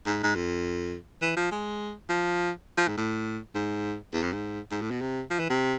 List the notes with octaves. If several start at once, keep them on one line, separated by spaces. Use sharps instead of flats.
G#2
G#2
F2
E3
F3
G#3
F3
F3
G#2
A2
G#2
E2
F2
G#2
G#2
A2
B2
C3
F3
E3
C3